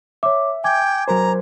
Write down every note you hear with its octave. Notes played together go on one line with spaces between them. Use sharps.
C#5 E5 D6
G5 G#5 D6 G#6
F#3 A#4 C5 A#5